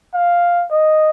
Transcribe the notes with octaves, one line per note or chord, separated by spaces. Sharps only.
F5
D#5